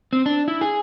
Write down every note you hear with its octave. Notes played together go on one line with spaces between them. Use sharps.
C4
D4
E4
G#4